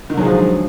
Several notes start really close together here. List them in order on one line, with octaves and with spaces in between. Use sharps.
D#3 D3 F#3 G#3 F3